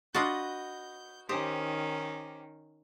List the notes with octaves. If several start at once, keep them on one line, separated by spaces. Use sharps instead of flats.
D4 F4 F#4 B4 D#5 A5 G6
D#3 C#4 D#4 G4 C5 D#6